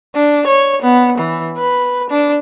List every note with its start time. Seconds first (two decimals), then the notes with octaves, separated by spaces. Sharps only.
0.15 D4
0.47 C#5
0.82 B3
1.18 E3
1.57 B4
2.10 D4